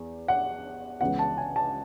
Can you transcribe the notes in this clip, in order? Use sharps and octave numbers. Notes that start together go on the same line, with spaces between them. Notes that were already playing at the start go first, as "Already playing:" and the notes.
Already playing: E2
F#5
C#2 C#3 E3 B3 F#5
A5
G#5
A5